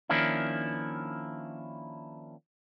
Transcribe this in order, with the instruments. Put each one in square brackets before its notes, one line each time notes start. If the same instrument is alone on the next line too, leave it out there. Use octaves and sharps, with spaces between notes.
[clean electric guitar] D#3 F3 A#3 C#4 D4 E4